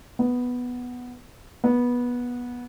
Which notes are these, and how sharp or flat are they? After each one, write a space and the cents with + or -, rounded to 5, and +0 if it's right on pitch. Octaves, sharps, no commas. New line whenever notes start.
B3 +0
B3 -15